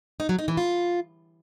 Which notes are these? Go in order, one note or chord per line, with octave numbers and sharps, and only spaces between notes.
D#4
F#3
D#4
E3
F4